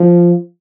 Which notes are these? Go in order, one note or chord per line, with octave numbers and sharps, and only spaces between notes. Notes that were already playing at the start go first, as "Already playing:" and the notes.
Already playing: F3